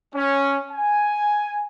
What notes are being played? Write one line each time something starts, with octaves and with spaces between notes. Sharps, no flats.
C#4
G#5